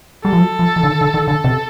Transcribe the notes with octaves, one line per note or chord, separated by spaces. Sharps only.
G3 A4
F3
F#3
F3
E3
D3
D#3
D3
D#3
D3 A4
C3